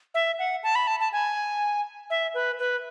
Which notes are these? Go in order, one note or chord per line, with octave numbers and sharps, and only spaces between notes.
E5
F#5
A5
B5
A5
A5
G#5
E5
B4
B4